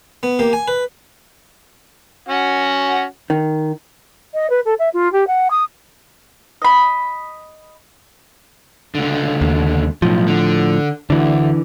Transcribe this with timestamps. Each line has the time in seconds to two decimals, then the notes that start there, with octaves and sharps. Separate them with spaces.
0.23 B3
0.39 A#3 G4
0.53 G#5
0.68 B4
2.29 C#4 F#4 F#5
3.30 D#3
4.34 D#5
4.50 B4
4.65 A4
4.79 E5
4.94 F4
5.12 G4
5.27 F#5
5.50 D#6
6.62 D#5 B5
8.95 C#2 D3
9.41 D#2
10.02 B1 A2 F3
10.28 D3
11.10 D2 D3 E3